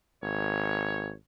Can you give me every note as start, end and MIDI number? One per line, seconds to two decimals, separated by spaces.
0.23 1.13 32
0.23 1.12 73